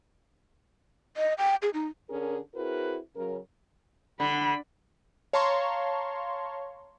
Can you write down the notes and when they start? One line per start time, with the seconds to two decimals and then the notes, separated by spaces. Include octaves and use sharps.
1.17 D#5
1.38 G5
1.62 G#4
1.74 D#4
2.10 D3 C#4 G#4 A#4
2.54 C4 E4 F#4 G#4 A#4 B4
3.16 C#3 F#3 A#4
4.20 D3 F#5 B5
5.33 C#5 F5 A5 A#5 C6 C#6